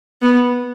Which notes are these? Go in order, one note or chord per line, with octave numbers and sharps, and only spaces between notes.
B3